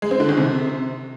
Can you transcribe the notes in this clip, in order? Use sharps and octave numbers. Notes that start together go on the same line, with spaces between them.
G#3
C4
D3
D#3
C3